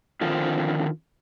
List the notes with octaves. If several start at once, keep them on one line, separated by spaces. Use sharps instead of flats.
D3 D#3 F3 C4 F4